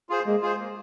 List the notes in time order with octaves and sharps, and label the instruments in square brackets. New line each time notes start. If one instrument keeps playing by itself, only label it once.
[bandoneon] F4 G#4 C5
[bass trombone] G#3 [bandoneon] A#3
[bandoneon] F4 G#4 C5
A#3